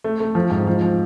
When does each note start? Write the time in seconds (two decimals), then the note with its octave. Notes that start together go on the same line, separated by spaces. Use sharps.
0.04 A3
0.20 A3
0.35 F3
0.50 G#2
0.67 F3
0.82 F3